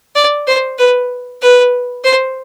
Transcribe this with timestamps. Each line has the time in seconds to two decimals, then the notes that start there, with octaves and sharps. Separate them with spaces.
0.16 D5
0.47 C5
0.79 B4
1.42 B4
2.04 C5